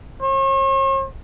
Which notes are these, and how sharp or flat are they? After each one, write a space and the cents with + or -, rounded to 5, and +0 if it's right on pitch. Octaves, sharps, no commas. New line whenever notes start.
C#5 -45